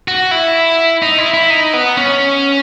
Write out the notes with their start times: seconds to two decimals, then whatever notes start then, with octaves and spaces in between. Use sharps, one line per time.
0.08 F#4
0.31 E4
1.02 D#4
1.18 E4
1.34 E4
1.50 D#4
1.73 B3
1.97 C#4